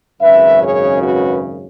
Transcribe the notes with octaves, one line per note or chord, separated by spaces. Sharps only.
G#1 F#2 C#3 B4 E5
G#4 C#5
F#4 B4